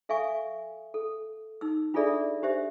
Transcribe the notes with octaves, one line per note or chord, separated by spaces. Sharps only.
A4 E5 F5 G#5 C#6
A4
D#4 E6
D4 F4 G#4 A4 D5 E5
D4 G4 C5 E5